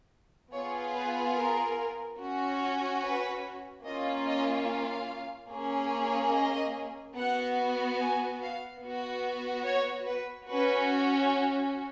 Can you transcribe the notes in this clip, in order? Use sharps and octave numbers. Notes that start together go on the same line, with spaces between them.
B3 F4 G#4 C#5
B4
A#4
C#4 F#4
B4
A#3 C#4 F4 D#5
D#5
F5
A#3 C#4 G#4
D#5
B3 F#4 F#5
G#5
F5
B3 F#4
C#5
B4
C#4 F#4 B4